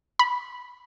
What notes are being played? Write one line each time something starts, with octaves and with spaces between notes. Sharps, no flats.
B5